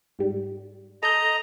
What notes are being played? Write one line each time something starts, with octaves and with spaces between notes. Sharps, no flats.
G#2 G3
A4 D#5 A#5 G6